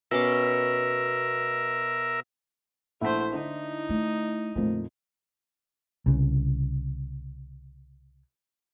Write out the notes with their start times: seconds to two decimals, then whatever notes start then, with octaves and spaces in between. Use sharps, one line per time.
0.11 B2 C#4 A#4 E5 D6
3.01 A#1 A3 E4 C5 F#5 B6
3.34 D3 D4 D#4
3.89 A3
4.56 F2 A#2 D3 A3
6.06 C2 C#3